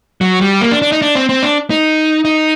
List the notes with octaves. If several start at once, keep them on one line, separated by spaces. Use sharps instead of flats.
F#3
G3
A#3
D4
D4
D#4
D4
C4
C4
D4
D#4
D#4